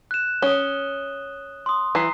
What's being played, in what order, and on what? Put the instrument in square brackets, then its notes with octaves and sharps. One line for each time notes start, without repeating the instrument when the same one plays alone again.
[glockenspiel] F#6 E7
[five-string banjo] C#4 [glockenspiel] D#6 G7
[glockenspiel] C6 D#6
[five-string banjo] E3 [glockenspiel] A#5 C7